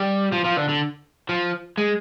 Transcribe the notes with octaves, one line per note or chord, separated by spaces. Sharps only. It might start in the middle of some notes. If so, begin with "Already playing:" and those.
Already playing: G3
F3
F3
D3
D3
F3
G#3